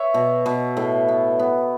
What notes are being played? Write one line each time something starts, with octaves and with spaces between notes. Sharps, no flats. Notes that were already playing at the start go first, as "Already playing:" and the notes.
Already playing: B4 C#5 E5
B2
B2
A2
B3
B3